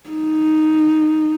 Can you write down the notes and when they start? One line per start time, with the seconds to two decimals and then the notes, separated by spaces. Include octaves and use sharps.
0.10 D#4